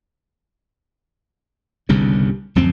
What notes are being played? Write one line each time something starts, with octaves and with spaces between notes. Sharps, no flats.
G1 C2 G2 C#3
D1 F#2 F3 C4